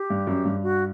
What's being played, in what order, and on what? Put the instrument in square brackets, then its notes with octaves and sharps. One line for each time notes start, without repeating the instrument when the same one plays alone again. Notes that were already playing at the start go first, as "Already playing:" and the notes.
Already playing: [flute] G4
[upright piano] G2
F#2
G2
[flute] F#4